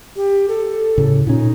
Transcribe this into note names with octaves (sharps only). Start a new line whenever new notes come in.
G4
A4
A2 C#3
A#2 C#4 D#4